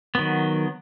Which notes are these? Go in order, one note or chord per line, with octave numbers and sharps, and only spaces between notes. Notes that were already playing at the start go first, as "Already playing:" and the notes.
D#3 F#3 B3